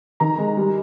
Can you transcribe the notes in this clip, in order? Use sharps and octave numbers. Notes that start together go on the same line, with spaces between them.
D#3 A#5
G#3
G3